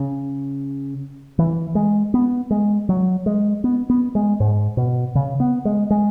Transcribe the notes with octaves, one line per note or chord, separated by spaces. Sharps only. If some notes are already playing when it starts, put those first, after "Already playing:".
Already playing: C#3
E3
G#3
B3
G#3
F#3
G#3
B3
B3
G#3
G#2
B2
C#3
B3
G#3
G#3